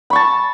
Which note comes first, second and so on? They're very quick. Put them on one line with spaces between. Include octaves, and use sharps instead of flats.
B5 C#6 A5